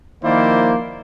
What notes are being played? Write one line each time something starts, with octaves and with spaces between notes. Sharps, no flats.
D#3 F3 A#3 E4 C5 D5